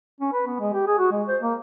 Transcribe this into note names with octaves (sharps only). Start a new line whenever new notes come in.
C#4
B4
B3
G#3
G4
G#4
F#4
G#3
C5
A#3